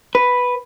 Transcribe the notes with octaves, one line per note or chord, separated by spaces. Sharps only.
B4